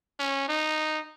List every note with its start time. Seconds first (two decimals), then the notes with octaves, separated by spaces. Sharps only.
0.19 C#4
0.48 D#4